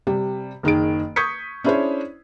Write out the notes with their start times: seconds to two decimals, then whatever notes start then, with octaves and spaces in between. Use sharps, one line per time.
0.07 C3 G3
0.63 F#1 D#3 G#4 D7
1.16 C#6 D#6 G6 G#6 B6 C#7
1.64 C#4 D4 E4 G#4 C5 C#5